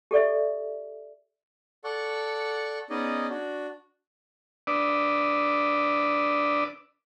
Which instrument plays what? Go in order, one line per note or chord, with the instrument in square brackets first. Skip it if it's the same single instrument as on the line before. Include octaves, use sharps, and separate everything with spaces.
[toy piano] G4 A4 D5 E5
[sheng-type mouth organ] A4 D5 F#5 C#6
B3 C#4 D#4 G#4 D5 D#5
D4 F#4
[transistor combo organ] D4 B4 D5 D#6 E6